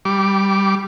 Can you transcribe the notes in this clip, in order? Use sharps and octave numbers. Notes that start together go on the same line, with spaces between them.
G3 D6